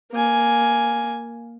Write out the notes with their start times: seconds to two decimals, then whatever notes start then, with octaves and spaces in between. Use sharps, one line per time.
0.12 A#3 G#5